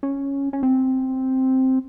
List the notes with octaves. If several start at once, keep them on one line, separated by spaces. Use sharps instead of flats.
C#4
C#4
C4